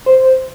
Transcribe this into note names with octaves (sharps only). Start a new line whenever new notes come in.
C5